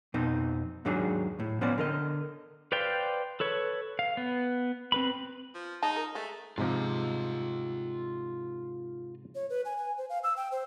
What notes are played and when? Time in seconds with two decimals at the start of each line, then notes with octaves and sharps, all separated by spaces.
0.14 F2 B2 C4 D#4
0.85 D#2 G#2 F#3 D4 D#4 G#4
1.40 A2
1.61 F3 B3 C#4 C5 D5
1.78 D3 A#4 D#5
2.72 B4 C5 D5 F5 G5
3.40 A4 B4 C#5
3.99 F5
4.17 B3
4.92 C4 B4 B5
5.55 F3
5.82 G#3 D#4 A5
5.96 A#4
6.15 G#3 A3
6.58 G#2 C3 F3 F4 D#5
9.35 C#5
9.50 B4
9.65 G#5
9.77 G#5
9.98 C5
10.09 F5
10.23 E6
10.37 G5
10.52 C5